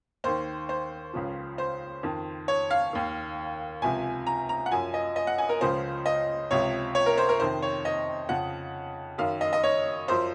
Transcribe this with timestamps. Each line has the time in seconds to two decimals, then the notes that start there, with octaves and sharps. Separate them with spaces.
0.24 D#2 D#3 C5
0.69 C5
1.14 C#2 C#3 F3
1.58 C5
2.03 F2 D#3
2.48 C#5
2.71 F5
2.93 D#2 D#3
3.82 C#2 C3 F3 G#5
4.27 A#5
4.49 A#5
4.66 F#5
4.71 F#2 F3 G#5
4.94 D#5
5.16 D#5
5.27 F#5
5.38 G#5
5.49 A#4
5.61 C#2 C#3 F3 C5
6.06 D#5
6.51 C#2 C3 F3 C#5
6.95 C#5
7.06 A#4
7.17 C5
7.29 A#4
7.40 F2 C3 D#3 C5
7.62 C#5
7.85 D#5
8.29 F2 C#3 F3 F#5
9.18 F#2 D#3 F5
9.41 D#5
9.53 D#5
9.63 C#5
10.08 F#2 F3 C5